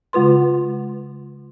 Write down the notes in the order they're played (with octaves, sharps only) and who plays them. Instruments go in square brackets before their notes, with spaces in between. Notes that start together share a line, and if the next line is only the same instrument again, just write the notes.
[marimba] C#3 G#3 F4 B4 C6